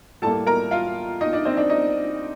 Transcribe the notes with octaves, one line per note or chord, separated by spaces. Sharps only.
A2 G3 A#3 A4 A5
A#4 A#5
F4 F5
D#4 D#5
D4 D5
C4 C5
D4 D5
D#4 D#5